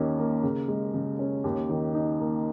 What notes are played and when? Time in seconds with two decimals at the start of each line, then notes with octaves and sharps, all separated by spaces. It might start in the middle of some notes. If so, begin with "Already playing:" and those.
Already playing: D#2 D#3 C#4
0.19 A#3
0.43 C#3
0.68 G#3
0.94 C#3
1.19 C#4
1.44 D#2
1.69 D#3
1.94 D#4
2.20 A#3